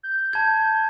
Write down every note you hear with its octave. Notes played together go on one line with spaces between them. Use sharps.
G6
A5 G#6